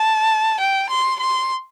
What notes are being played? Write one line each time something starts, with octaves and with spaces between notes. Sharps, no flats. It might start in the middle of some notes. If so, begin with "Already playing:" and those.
Already playing: A5
G5
C6
C6